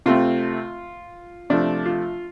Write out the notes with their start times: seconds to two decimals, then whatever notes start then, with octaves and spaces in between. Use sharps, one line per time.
0.06 C3 A3 C4 F4
1.50 C3 F3 A3 D4
1.86 F4